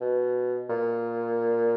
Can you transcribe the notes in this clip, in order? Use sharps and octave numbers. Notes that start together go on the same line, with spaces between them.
B2
A#2